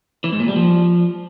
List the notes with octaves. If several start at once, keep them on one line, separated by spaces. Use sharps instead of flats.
E3
G#2
A#2
G3
F3